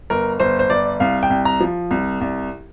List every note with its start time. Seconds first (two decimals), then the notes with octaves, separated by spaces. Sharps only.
0.10 G1 A#4
0.40 G1 C5
0.59 C5
0.70 G1 D5
1.00 C2 F5
1.23 G5
1.30 C2
1.45 A#5
1.60 F3
1.91 C2
2.21 C2